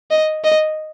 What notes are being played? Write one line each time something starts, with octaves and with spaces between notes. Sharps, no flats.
D#5
D#5